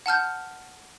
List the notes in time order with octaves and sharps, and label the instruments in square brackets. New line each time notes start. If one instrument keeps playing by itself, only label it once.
[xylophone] F#5 A5 F6 G6